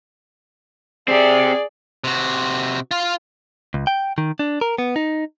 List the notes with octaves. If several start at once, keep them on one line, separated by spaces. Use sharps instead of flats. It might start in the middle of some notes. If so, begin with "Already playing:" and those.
C4 G4 G#4 D5
C3 F#4
F4 F5
C#2
G5
D#3
D4
A#4
B3
D#4